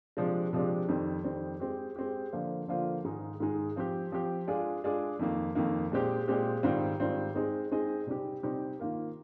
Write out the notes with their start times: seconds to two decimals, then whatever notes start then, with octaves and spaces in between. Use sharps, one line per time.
0.17 C3 F3 G#3 D4
0.53 C3 F3 G#3 D4
0.88 F2 D#3 G3 C4
1.24 F2 D#3 G3 C4
1.60 G#3 C4 G4
1.96 G#3 C4 G4
2.33 D3 F3 A#3 F4 C5
2.68 D3 F3 A#3 F4 C5
3.04 G#2 D#3 G#3 D#4 G#4
3.40 G#2 D#3 G#3 D#4 G#4
3.76 F3 C4 G4
4.12 F3 C4 G4
4.47 G#3 D4 F4 G#4 D5
4.84 G#3 D4 F4 G#4 D5
5.19 F2 D#3 A#3
5.55 F2 D#3 A#3
5.92 A#2 G#3 C4 G4
6.28 A#2 G#3 C4 G4
6.63 G#2 D#3 G3 C4 F4
6.99 G#2 D#3 G3 C4 F4
7.35 G#3 C4 D#4 G#4 D#5
7.71 G#3 C4 D#4 G#4 D#5
8.07 C3 G3 C4 D#4 G4
8.43 C3 G3 C4 D#4 G4
8.79 D#3 A#3 F4 A#4